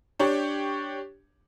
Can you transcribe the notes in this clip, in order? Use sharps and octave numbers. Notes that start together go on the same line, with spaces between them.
D4 G4 C#5